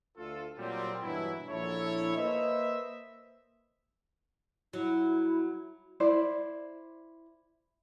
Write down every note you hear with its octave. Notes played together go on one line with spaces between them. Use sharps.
D2 F4 A4
A#2 F#3 G3 C4
G2 B2 E3 F#3 E4
A#1 E4 A4 C#5
A#3 B4 C5 D#5 E5
F#3 E4
E4 C5 D5